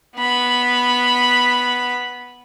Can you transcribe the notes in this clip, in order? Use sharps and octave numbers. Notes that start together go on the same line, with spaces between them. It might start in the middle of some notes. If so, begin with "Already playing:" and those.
B3 B5